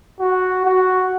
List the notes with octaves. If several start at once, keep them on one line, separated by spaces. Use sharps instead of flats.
F#4
F#4